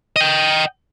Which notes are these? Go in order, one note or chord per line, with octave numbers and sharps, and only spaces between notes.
D#5 G5